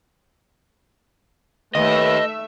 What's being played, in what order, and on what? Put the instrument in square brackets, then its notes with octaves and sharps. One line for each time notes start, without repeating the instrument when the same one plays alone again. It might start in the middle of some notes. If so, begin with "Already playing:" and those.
[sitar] D#2 [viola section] A3 E5 [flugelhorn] B4 [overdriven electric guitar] D#5